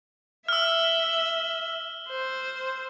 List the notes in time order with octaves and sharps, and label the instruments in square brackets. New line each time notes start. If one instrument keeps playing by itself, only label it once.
[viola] E5 [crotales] E6 F6
[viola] C5